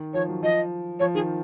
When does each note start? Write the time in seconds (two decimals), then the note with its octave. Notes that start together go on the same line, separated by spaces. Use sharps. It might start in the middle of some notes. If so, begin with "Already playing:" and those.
Already playing: D#3
0.14 F3 C#5
0.28 F#3
0.43 F3 D#5
1.00 F3 C#5
1.14 D#3 G#4